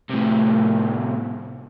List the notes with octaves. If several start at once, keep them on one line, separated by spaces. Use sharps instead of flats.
A2 C3